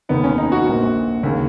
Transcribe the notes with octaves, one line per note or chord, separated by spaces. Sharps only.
F1 D#2 D#3 B3
C#4
D#4
F#4
A#1 A#2
D#2 C#3